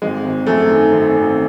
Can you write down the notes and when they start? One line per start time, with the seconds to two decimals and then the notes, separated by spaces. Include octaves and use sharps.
0.02 G#1 G#3
0.24 G#1
0.47 F#2 A3
0.70 D#3
0.91 G#1
1.14 G#1